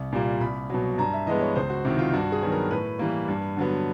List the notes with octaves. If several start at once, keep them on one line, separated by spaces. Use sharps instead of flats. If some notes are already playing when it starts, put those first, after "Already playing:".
Already playing: C2
A#2 G3 A#3
C2 B5
B2 F#3
G2 A#5
E5
E3 G#3 B3 D#5
C#5
C#2 C5
F#4
C3 D#3 E4
F4
G2 F#4
G#4
D#3 F#3 B3
A#4
A2 B4
E3 G3 A#3
G2
D3 F#3 B3